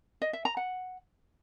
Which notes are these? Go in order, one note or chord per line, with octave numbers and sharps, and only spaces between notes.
D#5
E5
A#5
F#5